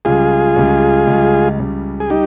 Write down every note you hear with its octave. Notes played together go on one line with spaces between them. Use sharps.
C#2 C#3 G3 F4 G#4
C#2 C#3 G3
C#2 C#3 G3
C#2 C#3 G3
G#4
G3 D#4 G4